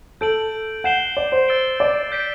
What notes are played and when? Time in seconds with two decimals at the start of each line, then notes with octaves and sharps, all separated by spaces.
0.21 A4 G6 D7 F#7
0.84 F#5 G6 C7 E7 G7
1.17 D5
1.32 C5
1.48 E6 A6 D7 G7
1.80 D5
2.12 G6 B6 D7